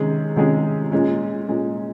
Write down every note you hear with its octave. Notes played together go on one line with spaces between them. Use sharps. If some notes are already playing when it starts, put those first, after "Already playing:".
Already playing: C3 D#3 G#3 C#4 G#4
C3 D#3 G#3 C#4 G#4
A#2 G#3 C#4
A#2 G#3 C#4